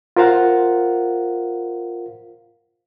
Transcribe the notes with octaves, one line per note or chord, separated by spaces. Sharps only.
F4 A#4 C5 F5 F#5